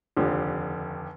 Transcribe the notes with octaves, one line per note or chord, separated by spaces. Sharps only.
F1 D#2 D3 F3